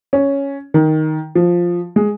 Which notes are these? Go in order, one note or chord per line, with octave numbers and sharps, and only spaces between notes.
C#4
D#3
F3
G#3